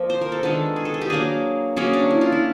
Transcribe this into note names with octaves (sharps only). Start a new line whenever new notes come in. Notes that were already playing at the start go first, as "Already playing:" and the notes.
Already playing: F3 A#3
C5
A#4
A4
D#3 G#3 B3 D4 A4
G#4
A4
G#4
G4
F#3 A#3 D4 G#4
F#3 A#3 C#4 G#4
D4
E4
F4
E4